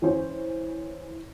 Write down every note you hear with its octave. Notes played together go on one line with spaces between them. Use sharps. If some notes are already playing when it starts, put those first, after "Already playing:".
E3 C#4 C5